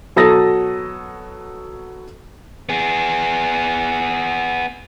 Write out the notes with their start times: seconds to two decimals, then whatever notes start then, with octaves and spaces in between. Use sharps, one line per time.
0.16 B2 F#3 A4 D#6 A6 A#6
2.69 B3 G#4